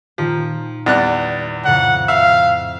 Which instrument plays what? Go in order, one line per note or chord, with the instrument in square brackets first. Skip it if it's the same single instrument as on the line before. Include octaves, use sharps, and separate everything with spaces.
[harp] A#2 D#3 G5 [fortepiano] F3
[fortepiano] E2 G3 F#6 [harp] C7
[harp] F2 A2 C#3 [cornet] F#5
[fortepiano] E5 [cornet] F5